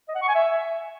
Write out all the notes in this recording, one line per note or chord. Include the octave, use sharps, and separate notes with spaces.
D#5
F#5
C#6
G#5
E5